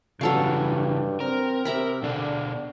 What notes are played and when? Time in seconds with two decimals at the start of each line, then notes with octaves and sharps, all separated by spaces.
0.21 G2 C#3 E3 F#3 A4 F5
1.20 C4 A#4
1.65 C3 E5 A#5 B5
2.03 B2 D3 D4